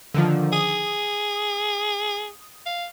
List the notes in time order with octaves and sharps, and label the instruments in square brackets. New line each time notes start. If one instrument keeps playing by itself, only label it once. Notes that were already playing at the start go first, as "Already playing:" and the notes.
[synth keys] D3 D#3 F3
[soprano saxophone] G#4 [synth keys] D#6
[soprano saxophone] F5